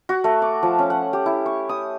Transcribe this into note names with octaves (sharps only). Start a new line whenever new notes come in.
F#4
A3
D6
F3
C#4
F#5
G4
E4
C#6
D#6